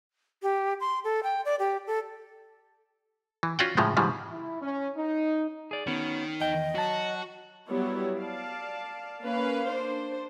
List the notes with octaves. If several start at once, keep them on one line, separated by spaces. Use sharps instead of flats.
G4
C6
A4
G5
D5
G4
A4
E3
C#4 F4 F#4 D5 F#5 G5
A2 C#3 F3 G#3 A3
G#2 C#3 E3 F3 G3
E4
C#4
D#4
G#4 D5
D#3 B3 C#4 F#4
E2 D#5 G5
F#3 F#4 A5
F#3 G3 B3 E4 C#5
D5 F5 A5
A#3 C#4 B4 F5
D4 C5